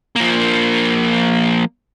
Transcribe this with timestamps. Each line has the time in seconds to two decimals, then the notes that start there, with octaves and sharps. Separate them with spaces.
0.16 F3 A#3